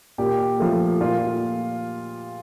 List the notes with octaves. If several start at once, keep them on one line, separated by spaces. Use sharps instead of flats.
A#2 G4
F3 A3
A#2 F4